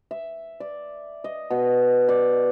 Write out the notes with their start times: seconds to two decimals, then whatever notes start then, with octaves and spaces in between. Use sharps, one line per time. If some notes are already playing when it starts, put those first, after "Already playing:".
0.11 E5
0.60 D5
1.24 D#5
1.50 B2
2.09 D5